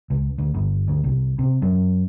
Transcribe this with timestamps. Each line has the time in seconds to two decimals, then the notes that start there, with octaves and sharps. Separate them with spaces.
0.10 C#2
0.38 D2
0.54 G1
0.88 D2
1.04 C2
1.39 C3
1.62 F#2